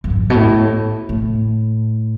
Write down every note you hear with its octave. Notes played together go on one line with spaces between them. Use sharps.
F#2
G#2
B2
A2
A2